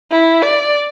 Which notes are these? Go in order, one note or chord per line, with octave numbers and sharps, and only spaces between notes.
E4
D5